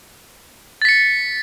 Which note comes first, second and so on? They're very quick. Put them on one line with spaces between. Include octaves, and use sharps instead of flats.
A6 B6 C#7